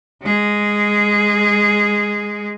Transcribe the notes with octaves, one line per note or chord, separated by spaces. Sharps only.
G#3 G#4